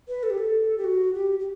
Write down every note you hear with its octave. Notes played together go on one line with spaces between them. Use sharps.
B4
A4
G4
A4
G4
F#4
G4
G4